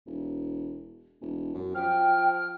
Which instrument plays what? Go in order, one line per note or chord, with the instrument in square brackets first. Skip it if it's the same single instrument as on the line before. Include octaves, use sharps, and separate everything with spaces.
[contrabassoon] E1
E1
F#2
[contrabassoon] F3 [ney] G5 [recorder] F6